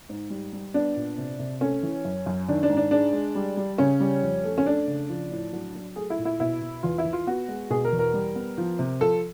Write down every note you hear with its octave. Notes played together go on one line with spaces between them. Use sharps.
G#2
G3
G3
B3 D4
A#2
C3
C3
A3 C#4
E3
F#2
F#2
D#3 D4
D4
G#2
D4
G#3 D4
G#3
G3
G3
C#3 C#4
G3
F2
A3
C#4
A3 D4
C#3
F3
A2
F#3
F#3
A3 G#4
E4
A#2
E4
B2 E4
B2
E2 F4
E4
E3
F4
B3 F#4
G#3
B2 G#4
A#4
E2
A#4
G3
B3
F3
C3
F3 A4